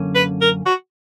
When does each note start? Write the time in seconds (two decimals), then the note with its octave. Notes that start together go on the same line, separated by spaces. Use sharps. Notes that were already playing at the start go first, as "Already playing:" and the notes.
Already playing: F#2 D3 A#3 C#4
0.15 B4
0.42 A#4
0.66 F#4